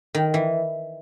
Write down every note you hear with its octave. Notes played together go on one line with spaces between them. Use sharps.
D#3
E3